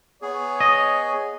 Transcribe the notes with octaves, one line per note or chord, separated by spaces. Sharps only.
B3 G#4 C#5
D#5